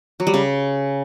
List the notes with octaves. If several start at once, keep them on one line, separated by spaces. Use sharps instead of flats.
F#3
G3
C#3